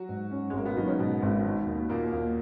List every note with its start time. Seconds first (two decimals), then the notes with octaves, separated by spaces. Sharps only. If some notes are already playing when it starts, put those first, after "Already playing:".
Already playing: F#3 F#4
0.09 G#2
0.31 C#4
0.50 G#3
0.53 G#1 A#3
0.65 B2 B3
0.76 D#3 F#3 D#4
0.87 C#3 C#4
0.99 G#2 B2 B3
1.22 G#1
1.45 D#3
1.67 D#2
1.89 D#2 A#2 A#3
2.13 D#2